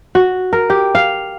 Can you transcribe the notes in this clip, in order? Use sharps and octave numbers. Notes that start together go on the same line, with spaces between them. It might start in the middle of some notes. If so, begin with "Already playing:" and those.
F#4
A#4
G4
F5